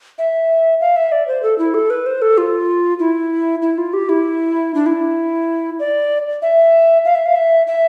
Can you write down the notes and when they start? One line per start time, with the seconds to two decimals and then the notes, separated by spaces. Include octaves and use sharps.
0.18 E5
0.81 F5
0.96 E5
1.12 D5
1.28 C5
1.43 A4
1.58 E4
1.74 A4
1.90 B4
2.06 C5
2.22 A4
2.38 F4
3.00 E4
3.62 E4
3.78 F4
3.93 G4
4.09 E4
4.74 D4
4.86 E4
5.80 D5
6.42 E5
7.05 F5
7.15 E5
7.26 F5
7.35 E5
7.67 E5